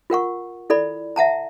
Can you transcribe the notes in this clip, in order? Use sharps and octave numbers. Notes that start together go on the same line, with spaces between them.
F4 A#4 F#5 C#6
E4 A4 D5 B5
E5 F#5 A5 A#5